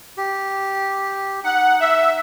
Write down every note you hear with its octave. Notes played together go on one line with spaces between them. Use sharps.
G4
D#4 F#5
E5